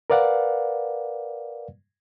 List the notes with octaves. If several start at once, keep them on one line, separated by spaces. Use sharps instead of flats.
A#4 B4 D5 F5 F#5